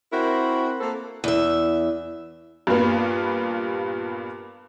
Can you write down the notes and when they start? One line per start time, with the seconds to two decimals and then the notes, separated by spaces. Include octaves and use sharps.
0.13 C4 E4 F#4 A#4 C5
0.80 A#3 C4 A4
1.24 E2 E5
2.67 G2 A#2 G3 A#3 B3